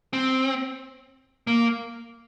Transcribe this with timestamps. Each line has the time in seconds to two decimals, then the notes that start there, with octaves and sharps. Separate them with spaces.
0.13 C4
1.47 A#3